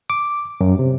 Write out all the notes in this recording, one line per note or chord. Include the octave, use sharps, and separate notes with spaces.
D6
F#2
C3